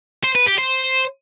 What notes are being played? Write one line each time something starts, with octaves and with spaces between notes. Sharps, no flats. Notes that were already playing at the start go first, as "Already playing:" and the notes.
C5
B4
G4
C5